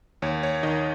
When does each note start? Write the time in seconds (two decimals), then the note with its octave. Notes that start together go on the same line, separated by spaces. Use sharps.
0.22 D#2 C#5
0.43 C#5
0.63 D#3 D#5